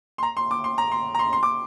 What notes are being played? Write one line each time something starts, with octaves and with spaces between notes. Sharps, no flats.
C6
A#5
C6
D6
C6
A#5
C6
A#5
C6
C6
D6